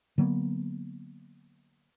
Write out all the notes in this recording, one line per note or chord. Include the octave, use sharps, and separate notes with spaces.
D3 F#3 A#3 B3